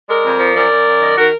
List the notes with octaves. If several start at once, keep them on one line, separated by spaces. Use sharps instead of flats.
G#3 A#4 D5
F2
F3
F#2 A#4 D5
F#2
F#2
D#3
D#3 F#4 A#4